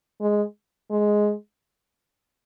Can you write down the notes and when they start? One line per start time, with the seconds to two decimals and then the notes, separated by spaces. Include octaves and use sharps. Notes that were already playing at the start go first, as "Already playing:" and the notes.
0.21 G#3
0.90 G#3